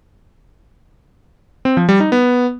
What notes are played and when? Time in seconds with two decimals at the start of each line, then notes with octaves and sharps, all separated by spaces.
1.65 C4
1.77 F3
1.89 G3
2.00 D#4
2.12 B3